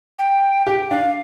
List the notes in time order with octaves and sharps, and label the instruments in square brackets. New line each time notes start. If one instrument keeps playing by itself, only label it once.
[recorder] G5
[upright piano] G4 [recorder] G5
[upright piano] D4 [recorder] F5